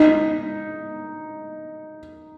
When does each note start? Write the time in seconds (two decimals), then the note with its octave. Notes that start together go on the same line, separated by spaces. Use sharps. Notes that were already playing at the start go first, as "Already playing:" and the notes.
Already playing: D#4